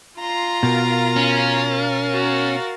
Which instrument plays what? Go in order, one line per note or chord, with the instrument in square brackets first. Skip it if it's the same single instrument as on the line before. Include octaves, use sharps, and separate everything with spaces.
[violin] F4 A#5 [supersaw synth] C6
[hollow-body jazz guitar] B2 [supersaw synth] A#4 F5 A6
[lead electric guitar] C#4
[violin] F#4